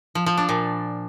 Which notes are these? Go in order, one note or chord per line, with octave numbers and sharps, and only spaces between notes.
F3
F3
D4
A#2